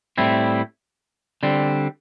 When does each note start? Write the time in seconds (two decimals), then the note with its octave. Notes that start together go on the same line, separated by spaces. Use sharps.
0.18 A2 G3 C4 E4
1.43 D3 G3 C4